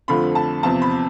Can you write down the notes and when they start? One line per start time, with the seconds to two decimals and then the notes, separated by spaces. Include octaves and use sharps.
0.08 F2 D3 F3 A3 B5
0.35 A5
0.63 E2 C3 F3 A5
0.82 B5